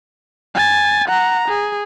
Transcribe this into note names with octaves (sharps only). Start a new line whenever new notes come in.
G#5 A6
F#5 A#5
G#4